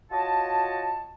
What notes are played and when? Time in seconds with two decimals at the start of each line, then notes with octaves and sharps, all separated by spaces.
0.11 F4 F#4 C#5 D#5 A5